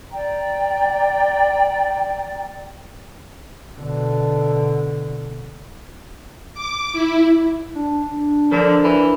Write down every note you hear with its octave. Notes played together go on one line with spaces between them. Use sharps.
D5 G5 A#5
B2 D3
D6
E4
D4
D3 F3 D4 A#4
E3